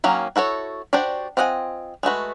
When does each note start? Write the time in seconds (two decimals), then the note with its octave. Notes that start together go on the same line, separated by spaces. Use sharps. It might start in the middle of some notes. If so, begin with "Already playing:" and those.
0.04 D#3 F#3 A#3 C#4
0.36 E4 F#4 A4 C#5
0.93 D4 F#4 G4 C5 D5
1.37 C4 F4 D#5 F#5 G#5
2.03 G#3 A3 F#4 B4